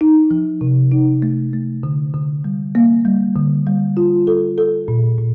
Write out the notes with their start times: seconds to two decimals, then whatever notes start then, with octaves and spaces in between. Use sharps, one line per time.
0.01 D#4
0.31 F3
0.61 C3
0.92 D#4
1.22 A3
1.53 A3
1.83 D3
2.14 D3
2.44 G3
2.75 A#3
3.05 G3
3.36 D3
3.66 G3
3.97 F4
4.27 A4
4.58 A4
4.88 A#2
5.18 A#2